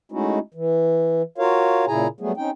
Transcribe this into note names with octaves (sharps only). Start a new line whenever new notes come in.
G#3 A3 C#4 D#4 E4 F#4
E3
F4 F#4 A#4 C#5 F5
A#2 C#3 E4 G#4 G#5 A#5
F#3 G3 A3 B3 G#4
C4 C#4 D#4 G5